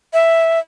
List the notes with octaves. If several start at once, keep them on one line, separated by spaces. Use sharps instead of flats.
E5